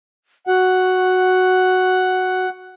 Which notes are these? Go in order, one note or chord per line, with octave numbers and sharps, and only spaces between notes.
F#4 F#5